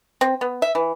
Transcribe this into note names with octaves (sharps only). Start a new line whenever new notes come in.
C4
B3
E5
E3